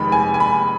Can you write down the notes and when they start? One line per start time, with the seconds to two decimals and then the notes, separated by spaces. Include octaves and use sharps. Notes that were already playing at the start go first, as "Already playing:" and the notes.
Already playing: F1 F2 D#3 G#3 B5
0.12 G#5
0.34 G#5
0.40 B5